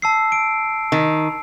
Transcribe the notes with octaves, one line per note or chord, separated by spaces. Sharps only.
A5 E6 C7
D7
D#3